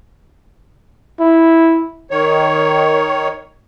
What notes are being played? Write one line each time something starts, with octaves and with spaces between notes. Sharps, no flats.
E4
D#3 C#5